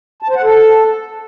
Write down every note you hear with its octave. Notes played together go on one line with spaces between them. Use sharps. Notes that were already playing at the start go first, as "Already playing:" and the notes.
A5
C5
F#5
A4